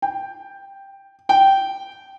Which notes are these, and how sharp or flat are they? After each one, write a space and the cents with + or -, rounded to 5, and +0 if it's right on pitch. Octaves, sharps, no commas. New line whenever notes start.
G5 +5
G5 -10